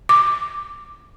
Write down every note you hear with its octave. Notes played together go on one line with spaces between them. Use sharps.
D6